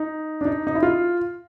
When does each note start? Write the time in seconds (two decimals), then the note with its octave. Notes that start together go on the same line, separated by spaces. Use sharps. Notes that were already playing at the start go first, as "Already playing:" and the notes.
Already playing: D#4
0.41 D4
0.45 D#4
0.67 D#4
0.75 E4
0.83 F4